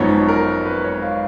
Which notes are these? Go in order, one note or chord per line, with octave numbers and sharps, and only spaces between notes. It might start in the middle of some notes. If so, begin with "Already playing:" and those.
Already playing: G#1 F#2 F3 B3 D#4 C#5
A#4
B4
C#5
F5